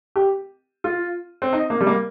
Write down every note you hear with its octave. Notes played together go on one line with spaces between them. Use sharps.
G4
F4
C4
D#4
A#3
G3
A#3